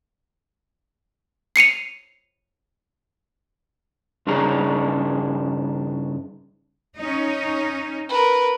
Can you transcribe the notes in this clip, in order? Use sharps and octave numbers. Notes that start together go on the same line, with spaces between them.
C7 C#7 D#7 F7
G2 C#3 D4 D#4 G#4 A#5
C#4 D#4
A#4 B4